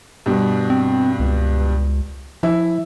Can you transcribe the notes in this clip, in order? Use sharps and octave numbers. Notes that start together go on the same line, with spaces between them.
G2 B2
C4
C#2
F3 E4